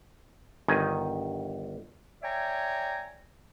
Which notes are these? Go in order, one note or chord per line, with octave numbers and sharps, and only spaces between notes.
G1 D#3 G#5
C#5 D5 E5 G5 G#5 A#5